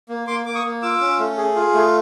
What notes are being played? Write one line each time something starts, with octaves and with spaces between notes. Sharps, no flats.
A#3
A#3 C6 D6
A#3 D6
C#6 D#6
A#3
F4 D6 E6
C#4
A3
G#4
F4
A3